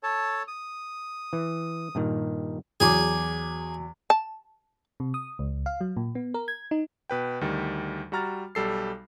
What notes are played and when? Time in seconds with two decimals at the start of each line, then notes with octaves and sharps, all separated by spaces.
0.03 A4 C#5 A5
0.48 D#6
1.33 E3
1.95 G2 A#2 D#3
2.80 E2 F#3 G#4 G#5 D6
4.10 A5
5.00 C3
5.14 D#6
5.39 C#2
5.66 F5
5.81 F#3
5.97 A#2
6.15 B3
6.34 A#4
6.48 G#6
6.71 D#4
7.10 B2 B4 G5
7.41 D2 D#3 G3
8.12 G3 F#4 A#5 F6 A6
8.55 B1 G3 A4 C7